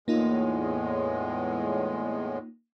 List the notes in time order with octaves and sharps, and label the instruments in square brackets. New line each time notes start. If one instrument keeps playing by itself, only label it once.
[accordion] E2 A2 G#3 [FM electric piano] A#3 D#4 F4